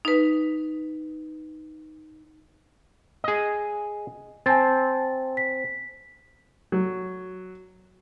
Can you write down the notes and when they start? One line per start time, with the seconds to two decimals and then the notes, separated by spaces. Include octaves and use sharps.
0.05 D#4 B4
3.24 G#4 D#5
4.46 C4 G#5 A5 A6
5.37 B6
6.72 F#3